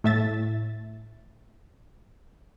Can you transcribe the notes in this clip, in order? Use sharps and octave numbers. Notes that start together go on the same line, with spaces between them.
A2 E5 A6